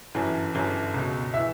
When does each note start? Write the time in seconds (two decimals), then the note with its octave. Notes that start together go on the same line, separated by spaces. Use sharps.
0.15 G1 F#2 E3
0.54 G1 F#2 E3
0.94 C#2 B2
1.34 E3 E5